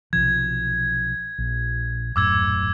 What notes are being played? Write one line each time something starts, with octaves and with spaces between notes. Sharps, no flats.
B1 C3 F3 G#6
A#1
D#1 F#2 A2 D6 E6 G#6